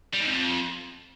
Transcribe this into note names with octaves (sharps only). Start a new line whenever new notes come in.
G3
G#2
F2